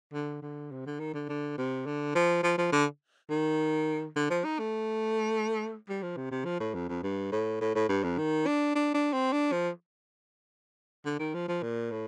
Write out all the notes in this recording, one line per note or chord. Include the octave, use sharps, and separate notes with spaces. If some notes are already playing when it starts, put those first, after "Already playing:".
D3
D3
C3
D3
D#3
D3
D3
C3
D3
F3
F3
F3
D3
D#3
D3
F3
D#4
A3
G3
F3
C3
C3
F3
A2
F2
F2
G2
A2
A2
A2
G2
F2
D#3
D4
D4
D4
C4
D4
F3
D3
D#3
F3
F3
A#2
A2